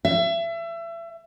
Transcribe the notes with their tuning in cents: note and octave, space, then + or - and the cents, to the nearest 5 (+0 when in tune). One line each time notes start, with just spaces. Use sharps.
E5 +30